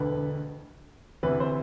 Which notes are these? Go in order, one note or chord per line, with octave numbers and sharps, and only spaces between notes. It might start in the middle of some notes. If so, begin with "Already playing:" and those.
Already playing: E1 D2 D3 B4
D2 C3 E3 B4
C5